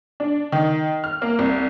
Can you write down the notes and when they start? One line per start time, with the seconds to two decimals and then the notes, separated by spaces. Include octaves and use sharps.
0.20 D4
0.52 D#3
1.04 F6
1.22 A#3
1.39 C2